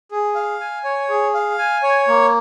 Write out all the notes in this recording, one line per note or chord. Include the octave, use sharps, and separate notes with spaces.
G#4
F5
G#5
C#5
G#4
F5
G#5
C#5
A#3